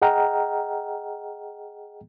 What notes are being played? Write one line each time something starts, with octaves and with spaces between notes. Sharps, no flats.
G#4 D#5 F#5 G5 A#5 F6